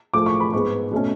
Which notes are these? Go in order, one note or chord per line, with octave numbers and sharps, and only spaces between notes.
A2 F3 A3 D6
C#6
B5
G#2 G#3 B3 C#6
B2 A3 C#4